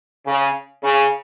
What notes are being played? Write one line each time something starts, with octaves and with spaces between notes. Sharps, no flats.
C#3
C#3